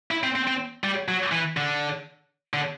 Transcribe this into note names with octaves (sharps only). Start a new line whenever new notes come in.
E4
C4
C4
C4
G3
F#3
E3
D3
D3